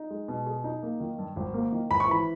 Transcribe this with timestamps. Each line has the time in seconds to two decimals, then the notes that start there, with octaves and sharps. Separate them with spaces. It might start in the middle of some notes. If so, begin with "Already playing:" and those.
Already playing: D#4
0.10 G#3
0.28 B2
0.47 G#4
0.64 D#4
0.83 A#3
1.00 D#3
1.19 G2
1.36 G#1
1.54 A#3
1.72 D#3
1.90 G#1 B5
2.00 C#6
2.08 E3 B5